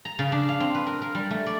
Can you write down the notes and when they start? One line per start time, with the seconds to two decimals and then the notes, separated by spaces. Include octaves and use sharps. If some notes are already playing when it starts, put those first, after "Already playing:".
0.05 A#5
0.19 C#3
0.32 D4
0.49 F5
0.60 C4
0.75 B4
0.87 A#4
1.02 A#4
1.15 G3
1.31 A3
1.46 D5